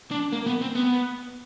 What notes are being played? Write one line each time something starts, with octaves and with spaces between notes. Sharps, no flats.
D4
A#3
B3
C4
B3